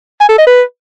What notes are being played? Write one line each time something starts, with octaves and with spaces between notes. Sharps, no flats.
G#5
A4
D#5
B4